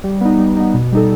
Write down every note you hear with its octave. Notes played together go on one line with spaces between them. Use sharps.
G3
B3 D#4
G3
B3 D#4
B2
G3 D#4 A4